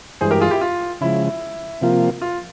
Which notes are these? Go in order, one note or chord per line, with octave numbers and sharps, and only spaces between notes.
G2 E3 G#3 G#4 C5
G4 A#4
F4 G#4
E4 G4
F4
C#3 F3 G#3 E4
C3 F3 A#3 F4
F4